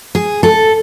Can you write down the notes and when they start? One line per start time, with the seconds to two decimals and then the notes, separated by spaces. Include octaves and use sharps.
0.15 G#4
0.43 A4